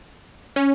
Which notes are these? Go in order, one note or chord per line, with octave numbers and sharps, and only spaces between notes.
C#4